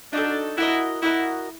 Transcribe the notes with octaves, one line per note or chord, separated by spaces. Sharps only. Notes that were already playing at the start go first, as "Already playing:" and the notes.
D4 D#4 F#4 A4
E4 F#4 A#4 D#5
E4 F#4 A#4 D#5